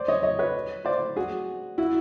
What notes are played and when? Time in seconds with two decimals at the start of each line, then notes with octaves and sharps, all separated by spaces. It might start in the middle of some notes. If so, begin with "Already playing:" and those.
Already playing: C5 D5
0.08 C#5 D#5
0.23 C#5 D#5
0.39 B4 C#5
0.85 C5 D5
1.16 F#4 G#4
1.78 E4 F#4